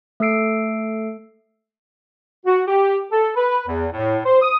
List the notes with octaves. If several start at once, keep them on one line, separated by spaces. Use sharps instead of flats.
A3 A4 E6 C7 D7
F#4
G4
A4
B4
E2
A2
C5
D#6